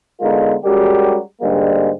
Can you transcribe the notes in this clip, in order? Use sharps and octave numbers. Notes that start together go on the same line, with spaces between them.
D3 G#3 B3 D#4 F4 A#4
G3 G#3 C#4 F#4 G4 A#4
G#2 D3 G3 G#3 A#3